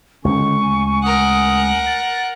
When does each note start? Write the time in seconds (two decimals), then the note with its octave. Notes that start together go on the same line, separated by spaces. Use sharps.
0.25 C#2 D3 C#4 C#6
0.62 D2 G#5
1.03 A#4 F#5 D#6
1.86 A6